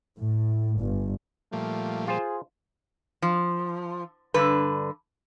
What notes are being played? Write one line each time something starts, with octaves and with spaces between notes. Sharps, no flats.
A2
G1
A#2 F3 G3 A3
F4 G#4 C5
F3
G2 D3 B4